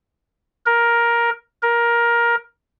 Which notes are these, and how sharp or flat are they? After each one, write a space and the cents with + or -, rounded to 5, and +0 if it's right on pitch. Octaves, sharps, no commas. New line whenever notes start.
A#4 +10
A#4 +15